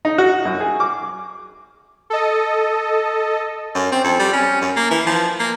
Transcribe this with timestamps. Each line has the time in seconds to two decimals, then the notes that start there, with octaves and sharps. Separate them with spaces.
0.05 D#4
0.18 F#4
0.45 F#2
0.60 G#4
0.80 D6
2.10 A4 D#5
3.75 F#2
3.92 C4
4.05 F2
4.20 G3
4.33 C#4
4.62 F#2
4.76 A#3
4.91 E3
5.06 F3
5.40 A#3